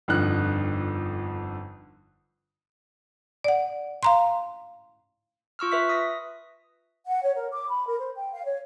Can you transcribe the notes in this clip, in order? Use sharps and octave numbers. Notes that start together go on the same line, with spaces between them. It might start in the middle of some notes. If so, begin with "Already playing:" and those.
G1 F2 D3 D#4 F#6
D5 F#5
F5 A#5 C6
F4 C#6 E6 F6
B4 E5 B6
D#6 A#6
F#5
C#5
A#4
D6
B5
A#4
C5
G5
F5
C#5